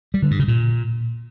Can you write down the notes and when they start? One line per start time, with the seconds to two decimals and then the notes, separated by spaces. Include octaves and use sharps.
0.14 G3
0.22 D3
0.31 G2
0.39 C#3
0.48 A#2